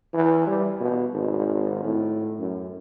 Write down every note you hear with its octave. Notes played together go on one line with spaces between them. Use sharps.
E3
G3
B2
G#1
A2
F#2